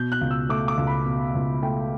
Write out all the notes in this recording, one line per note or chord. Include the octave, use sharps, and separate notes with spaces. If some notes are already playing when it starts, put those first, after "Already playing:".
Already playing: B2 G6
F#6
C#2
E6
A3 D6
D6
C#2
B5
B2
C#2
A3 G5